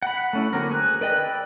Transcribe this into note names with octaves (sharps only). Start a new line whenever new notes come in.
F#5 B5
A3 C#4 E4
D3 F#3 A#3 C4 A#4
G#4 F#6
A#4 B4 D5 D#5 G5
D5 G5 B5 E6